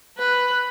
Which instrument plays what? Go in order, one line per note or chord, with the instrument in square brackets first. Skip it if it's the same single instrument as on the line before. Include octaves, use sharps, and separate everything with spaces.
[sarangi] B4